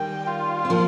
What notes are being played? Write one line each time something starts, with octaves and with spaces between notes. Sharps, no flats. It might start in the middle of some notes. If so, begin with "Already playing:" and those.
Already playing: D#3 G3 G5
F4
C4
F3 A#3